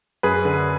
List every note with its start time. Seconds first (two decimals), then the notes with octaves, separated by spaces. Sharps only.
0.23 F#2 G#4 B4
0.45 D3